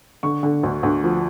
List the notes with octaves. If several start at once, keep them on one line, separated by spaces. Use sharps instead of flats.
D3 C#6
D3
D2
D2
F3